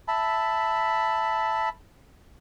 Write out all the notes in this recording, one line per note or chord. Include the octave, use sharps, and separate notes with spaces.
E5 A5 B5